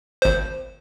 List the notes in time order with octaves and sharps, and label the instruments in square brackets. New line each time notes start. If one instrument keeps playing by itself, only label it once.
[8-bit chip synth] G#1 C5